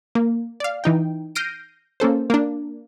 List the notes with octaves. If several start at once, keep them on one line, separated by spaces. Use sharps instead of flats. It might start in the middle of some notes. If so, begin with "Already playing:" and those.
A#3
D5 F5
E3 D#4 G5
F6 G6 A#6 C7 D7 D#7
A#3 C#4 A4 C5
A#3 D4